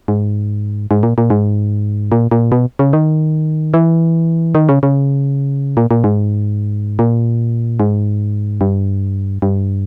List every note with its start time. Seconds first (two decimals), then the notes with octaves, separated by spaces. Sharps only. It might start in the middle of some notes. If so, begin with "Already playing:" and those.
0.08 G#2
0.91 G#2
1.03 A#2
1.18 A#2
1.30 G#2
2.12 A#2
2.31 A#2
2.52 B2
2.79 C#3
2.93 D#3
3.74 E3
4.55 D#3
4.69 C#3
4.83 C#3
5.77 A#2
5.91 A#2
6.04 G#2
6.99 A#2
7.80 G#2
8.61 G2
9.42 G2